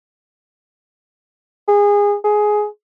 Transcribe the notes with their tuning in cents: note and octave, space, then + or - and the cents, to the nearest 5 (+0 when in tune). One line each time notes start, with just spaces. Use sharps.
G#4 -25
G#4 +15